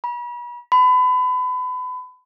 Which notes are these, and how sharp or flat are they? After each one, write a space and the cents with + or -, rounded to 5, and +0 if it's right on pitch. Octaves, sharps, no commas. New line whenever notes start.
B5 -40
B5 +30